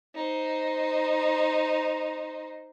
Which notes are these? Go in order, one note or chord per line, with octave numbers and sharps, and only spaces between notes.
D#4 C5